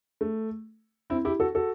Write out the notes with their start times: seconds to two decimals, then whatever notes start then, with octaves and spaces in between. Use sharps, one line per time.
0.21 A3
1.10 C4 E4
1.25 E4 G4
1.40 F#4 A4
1.55 F#4 A4